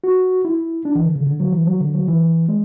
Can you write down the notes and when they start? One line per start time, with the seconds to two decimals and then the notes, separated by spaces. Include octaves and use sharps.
0.04 F#4
0.45 E4
0.85 D4
0.95 E3
1.05 D3
1.16 C#3
1.26 D3
1.40 F#3
1.53 E3
1.67 F#3
1.80 D3
1.94 F#3
2.08 E3
2.49 G#3